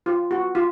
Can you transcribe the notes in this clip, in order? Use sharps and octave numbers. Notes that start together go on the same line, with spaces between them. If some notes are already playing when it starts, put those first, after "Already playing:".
F4
F#4
F4